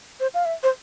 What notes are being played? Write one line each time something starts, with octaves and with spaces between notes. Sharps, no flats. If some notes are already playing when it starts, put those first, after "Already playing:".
C5
F5
E5
C5